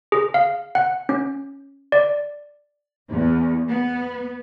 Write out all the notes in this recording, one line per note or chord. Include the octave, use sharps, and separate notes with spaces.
G#4
F5
F#5
C#4
D5
E2
B3